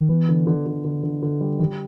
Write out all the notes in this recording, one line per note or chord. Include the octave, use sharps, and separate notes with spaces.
D#3
E3 B3
D3
D3
D3
D3
D3
D3
G3
D#3 G3